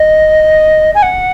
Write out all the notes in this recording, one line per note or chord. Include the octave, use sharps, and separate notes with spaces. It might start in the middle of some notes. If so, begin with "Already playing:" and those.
Already playing: D#5
G#5
F#5